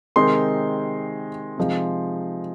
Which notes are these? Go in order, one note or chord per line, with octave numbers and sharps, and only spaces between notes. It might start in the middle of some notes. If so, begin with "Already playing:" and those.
C3 D#3 G#3 C4 D#4 C6
C3 F3 G#3 D#4